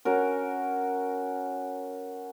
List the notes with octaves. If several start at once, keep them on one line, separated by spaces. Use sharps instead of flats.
C#4 F#4 A#4